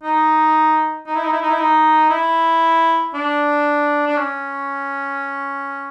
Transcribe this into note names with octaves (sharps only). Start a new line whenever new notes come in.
D#4
D#4
E4
D#4
E4
D#4
E4
D#4
E4
D4
D4
C#4